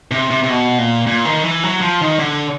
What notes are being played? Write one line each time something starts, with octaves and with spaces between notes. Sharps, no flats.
C3
C3
C3
B2
A#2
A#2
D#3
E3
F#3
F3
D#3
D3